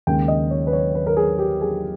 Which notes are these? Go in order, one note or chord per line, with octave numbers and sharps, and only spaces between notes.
D#2 C#3 G#3 G5
D#5
C#5
B4
C#5
B4
A#4
G#4
G4
G#4